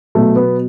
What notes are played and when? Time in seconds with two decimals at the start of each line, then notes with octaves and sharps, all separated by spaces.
0.15 B2 F#3 A3
0.36 B3